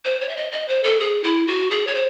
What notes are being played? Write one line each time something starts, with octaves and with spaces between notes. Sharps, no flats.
C5
C#5
E5
D#5
D#5
C5
A4
G#4
E4
F#4
G#4
C#5
C5